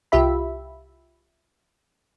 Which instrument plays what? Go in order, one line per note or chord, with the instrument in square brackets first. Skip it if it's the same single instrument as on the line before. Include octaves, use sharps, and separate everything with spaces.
[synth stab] C2 F4 G4 E5 B5